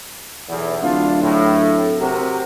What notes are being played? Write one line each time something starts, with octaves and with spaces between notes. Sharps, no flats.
B1 E2
D1 D4 E4 F4
A2
C3 F#4 A#4